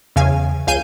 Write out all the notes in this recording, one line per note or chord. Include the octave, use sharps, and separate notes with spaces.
E2 C#3 F5 G#5
C#2 F5 G#5 G6 D#7